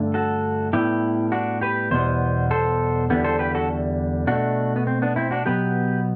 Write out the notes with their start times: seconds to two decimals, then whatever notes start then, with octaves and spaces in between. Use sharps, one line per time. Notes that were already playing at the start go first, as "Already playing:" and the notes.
Already playing: G2 D3 A3
0.14 F#4 A4
0.73 A2 G3 B3 E4 G4
1.32 D4 F#4
1.61 G4 B4
1.91 E2 B2 G3 B3 C5
2.51 A4 C5
3.10 E2 D3 G3 B3
3.24 A4 C5
3.39 G4 B4
3.55 F#4 A4
4.27 B2 A3 D4 F#4
4.76 B3
4.87 C4
5.02 B3 D4
5.16 C4 E4
5.31 D4 F#4
5.46 B2 F#3 B3 G4 B4